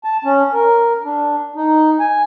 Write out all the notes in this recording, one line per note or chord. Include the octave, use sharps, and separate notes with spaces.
A5
C#4
A#4
D4
D#4
G#5